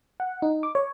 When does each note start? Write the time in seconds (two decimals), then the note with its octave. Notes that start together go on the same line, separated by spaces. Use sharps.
0.20 F#5
0.42 D#4
0.63 D6
0.75 C#5